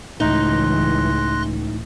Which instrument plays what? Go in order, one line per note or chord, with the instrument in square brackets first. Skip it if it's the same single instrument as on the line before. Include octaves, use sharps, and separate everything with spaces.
[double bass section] C#2 E3 [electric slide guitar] A2 [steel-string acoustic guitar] D#4 [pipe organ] C6 F#6 A#6